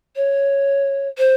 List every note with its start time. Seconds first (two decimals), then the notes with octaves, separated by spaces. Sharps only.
0.16 C#5
1.18 C5